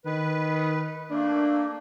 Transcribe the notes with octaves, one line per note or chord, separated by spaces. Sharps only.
D#3 B4
A3 A#3 D4